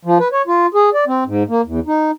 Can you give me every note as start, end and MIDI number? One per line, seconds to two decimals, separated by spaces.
0.05 0.18 53
0.20 0.28 71
0.32 0.42 73
0.47 0.66 65
0.74 0.90 68
0.94 1.05 74
1.07 1.24 60
1.27 1.43 44
1.49 1.61 58
1.66 1.80 40
1.87 2.11 63